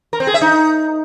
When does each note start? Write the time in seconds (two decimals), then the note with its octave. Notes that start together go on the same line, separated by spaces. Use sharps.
0.13 A#4
0.20 C4
0.27 G#4
0.34 E5
0.41 D#4